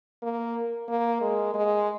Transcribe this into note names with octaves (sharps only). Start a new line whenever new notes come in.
A#3
A#3
G#3
G#3